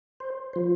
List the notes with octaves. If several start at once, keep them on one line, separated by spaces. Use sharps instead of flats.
C5
F3 C5